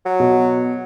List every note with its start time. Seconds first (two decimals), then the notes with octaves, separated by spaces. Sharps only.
0.06 F#3
0.20 B2